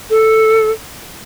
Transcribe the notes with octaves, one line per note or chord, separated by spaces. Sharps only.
A4